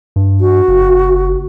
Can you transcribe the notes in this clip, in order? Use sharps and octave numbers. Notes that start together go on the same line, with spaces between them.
G2
F#4
F#1